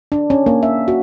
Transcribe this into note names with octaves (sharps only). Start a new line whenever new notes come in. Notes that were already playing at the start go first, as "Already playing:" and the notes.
D4
C#4
A#3
E5
F#4